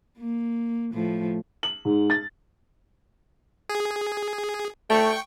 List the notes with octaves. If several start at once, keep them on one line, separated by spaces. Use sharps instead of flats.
A#3
A2 F3
F#7
G#2
A6
G#4
A3 G5 C#6